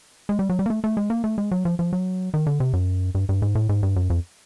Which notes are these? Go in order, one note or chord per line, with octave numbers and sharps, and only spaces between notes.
G#3
G3
F#3
G3
A#3
A3
A3
G#3
A#3
A3
G#3
F#3
F3
F3
F#3
D#3
D3
C3
F#2
G2
G2
G#2
A2
G#2
G2
F#2
F2